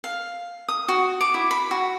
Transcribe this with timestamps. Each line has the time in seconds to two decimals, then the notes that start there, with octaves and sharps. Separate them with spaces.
0.04 F5
0.68 D#6
0.88 F#4
1.21 D6
1.34 E4
1.51 B5
1.71 F#4